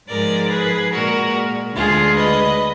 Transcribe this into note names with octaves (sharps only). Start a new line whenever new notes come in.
G#2 F3 G#3 A#4 D5
G#4 B4
A#2 G#3 F#4 A#4
D2 D3 G#3 F4 G#4
B4 D#5